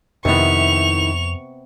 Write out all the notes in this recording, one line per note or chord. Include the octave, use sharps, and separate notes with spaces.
F2 C3 D#3 B3 E4 C#6 F7